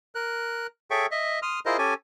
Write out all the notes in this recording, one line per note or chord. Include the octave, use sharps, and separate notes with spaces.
A#4 F#6
G#4 A4 C#5 E5 G5 C#6
D#5 E5
C6 D#6 F6
E4 F4 G#4 A#4 C5 D#5
C#4 G4 A4 G#5